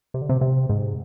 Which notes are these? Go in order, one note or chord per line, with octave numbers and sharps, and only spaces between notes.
C3
D3
C3
C3
G#2